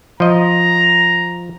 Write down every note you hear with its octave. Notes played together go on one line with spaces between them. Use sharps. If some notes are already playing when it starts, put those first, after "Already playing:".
F3 D#5 A#5